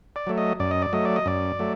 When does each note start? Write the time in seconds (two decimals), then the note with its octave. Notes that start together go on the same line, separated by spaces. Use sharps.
0.16 D5
0.27 F#3 A3
0.38 D#5
0.60 F#2 D5
0.71 D#5
0.82 D5
0.93 F#3 A3 D#5
1.05 D5
1.16 D#5
1.26 F#2 D5
1.59 F#3 A3